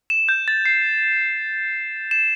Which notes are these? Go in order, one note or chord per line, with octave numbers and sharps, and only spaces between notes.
E7
G6
A6
C7
E7